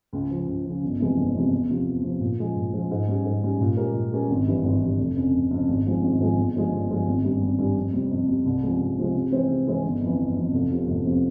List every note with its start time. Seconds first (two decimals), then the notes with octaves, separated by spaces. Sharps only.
0.13 C#2
0.31 C#3 F3
0.48 C#2
0.65 C#3 F3
0.83 G1
1.00 F2 C3 E3 G#3
1.18 G1
1.35 F2 C3 E3 G#3
1.53 E2
1.69 C3 F3
1.87 E2
2.04 C3 F3
2.21 A#2
2.39 F3 G#3
2.56 A#2
2.73 F3 G#3
2.91 G#2
3.08 G3 C#4
3.25 G#2
3.43 G3 C#4
3.61 A#2
3.77 G#3 C#4 G4 A#4
3.94 A#2
4.12 G#3 C#4 G4 A#4
4.30 G#1
4.47 G2 E3
4.64 G#1
4.82 G2 E3
4.99 F1
5.16 F2 C#3
5.34 F1
5.51 F2 C#3
5.69 G#1
5.86 G#2 F3 G#3
6.03 G#1
6.20 G#2 F3 G#3
6.37 G1
6.55 G2 F3 G#3
6.73 G1
6.90 G2 F3 G#3
7.07 G#1
7.24 G2 G3 C#4
7.42 G#1
7.58 G2 G3 C#4
7.76 F2
7.93 C3 G3
8.11 F2
8.28 C3 G3
8.46 C2
8.63 C3 F3 G#3
8.80 C2
8.98 C3 F3 G#3
9.15 C3
9.32 E3 G#3 C4
9.49 C3
9.67 E3 G#3 C4
9.85 G1
10.01 F2 E3
10.19 G1
10.36 F2 E3
10.53 F1
10.71 E2 C3 F3
10.88 F1
11.05 C3 F3